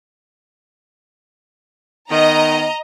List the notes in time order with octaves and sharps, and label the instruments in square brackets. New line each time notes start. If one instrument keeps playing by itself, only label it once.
[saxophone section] D#3 B3 [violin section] D#5 A#5